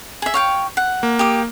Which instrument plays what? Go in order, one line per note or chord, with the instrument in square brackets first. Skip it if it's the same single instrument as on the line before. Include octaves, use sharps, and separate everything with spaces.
[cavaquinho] G#4 E5
C#5 F5 G5
F#5
[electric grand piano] A#3
[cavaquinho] G4 D#6